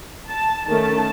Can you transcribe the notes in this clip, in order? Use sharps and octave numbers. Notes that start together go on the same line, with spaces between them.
A5
D#3 A3 C#4 A5